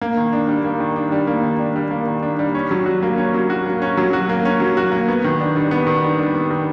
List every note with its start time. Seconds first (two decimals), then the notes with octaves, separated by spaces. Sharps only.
0.02 A#3
0.17 D#3
0.33 D4
0.48 G3
0.64 A#3
0.80 D#3
0.96 D4
1.12 G3
1.27 A#3
1.43 D#3
1.59 D4
1.76 G3
1.91 A#3
2.08 D#3
2.23 D4
2.39 G3
2.55 C#4
2.71 F#3
2.86 F#4
3.02 A#3
3.18 C#4
3.34 F#3
3.50 F#4
3.66 A#3
3.82 C#4
3.97 F#3
4.13 F#4
4.29 A#3
4.45 C#4
4.60 F#3
4.77 F#4
4.92 A#3
5.08 B3
5.24 D#3
5.40 D4
5.56 G3
5.71 B3
5.87 D#3
6.04 D4
6.19 G3
6.35 B3
6.51 D#3